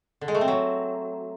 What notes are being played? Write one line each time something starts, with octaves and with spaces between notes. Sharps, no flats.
D3
G#3
A3
C4
F#3